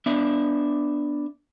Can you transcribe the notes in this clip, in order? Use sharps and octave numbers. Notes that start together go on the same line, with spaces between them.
B3 D4 E5